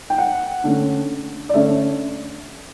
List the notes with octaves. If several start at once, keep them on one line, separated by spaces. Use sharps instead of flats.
G5
F#5
D3 A3 C#4
D5
D3 A3 C#4 E5